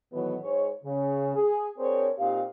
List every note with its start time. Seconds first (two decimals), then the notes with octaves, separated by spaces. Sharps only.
0.12 A2 D#3 E3 F#3 B3
0.41 G#2 C#5
0.84 C#3
1.35 G#4
1.78 C4 D4 G#4 A#4 C5 C#5
2.18 A#2 C4 D#4 G4 F5